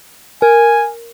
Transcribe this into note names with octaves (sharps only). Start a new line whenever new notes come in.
A#4 G#5